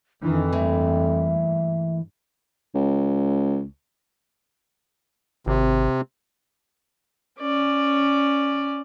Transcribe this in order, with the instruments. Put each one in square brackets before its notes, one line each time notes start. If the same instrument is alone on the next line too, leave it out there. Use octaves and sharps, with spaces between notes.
[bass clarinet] F2 [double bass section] D#3 E3 [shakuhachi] D4
[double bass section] G2 [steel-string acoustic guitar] E3 A3 A#3 [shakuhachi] E5
[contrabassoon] C#2
[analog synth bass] G#1 [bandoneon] C3
[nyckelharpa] C#4 D5